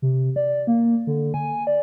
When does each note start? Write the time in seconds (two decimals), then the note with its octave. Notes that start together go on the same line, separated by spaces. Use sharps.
0.02 C3
0.36 D5
0.67 A#3
1.07 D3
1.34 G#5
1.67 D5